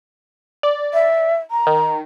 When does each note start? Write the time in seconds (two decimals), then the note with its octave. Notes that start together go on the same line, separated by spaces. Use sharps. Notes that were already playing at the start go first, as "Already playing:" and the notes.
0.63 D5
0.93 E5
1.51 A#5
1.67 D#3